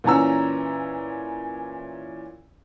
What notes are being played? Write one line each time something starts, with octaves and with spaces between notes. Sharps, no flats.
A#2 E3 C#4 A#5 E6